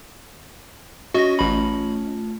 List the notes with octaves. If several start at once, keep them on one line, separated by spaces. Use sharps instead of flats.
C#4 F#4 D#5 A#6
A1 A3 F4 B5